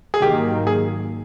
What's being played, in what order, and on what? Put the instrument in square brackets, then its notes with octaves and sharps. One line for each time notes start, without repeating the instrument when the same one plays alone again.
[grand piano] G#4
[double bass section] G#2 D#3 F#3 A#3 [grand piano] G4
[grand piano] G#4